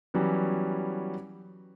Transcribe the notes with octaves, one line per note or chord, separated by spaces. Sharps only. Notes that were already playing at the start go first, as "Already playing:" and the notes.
E3 F#3 G3 B3 C#4